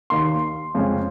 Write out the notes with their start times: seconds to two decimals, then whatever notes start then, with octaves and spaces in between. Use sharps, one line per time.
0.10 D#2 D#3 A#3 C6
0.74 F2 C#3 G#3 C#4